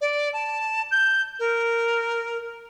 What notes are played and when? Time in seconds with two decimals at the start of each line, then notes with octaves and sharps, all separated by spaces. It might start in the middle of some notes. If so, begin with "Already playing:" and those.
0.01 D5
0.33 A5
0.91 G6
1.39 A#4